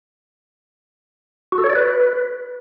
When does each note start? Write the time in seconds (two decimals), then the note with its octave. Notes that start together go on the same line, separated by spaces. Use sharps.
1.52 F#4
1.58 A4
1.64 C#5
1.70 D5
1.75 B4